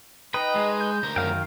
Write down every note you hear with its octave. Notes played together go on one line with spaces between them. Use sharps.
D#4 B4 D#5 G5
G#3
G6
D2 A#4
F#2 D#3 F5 G5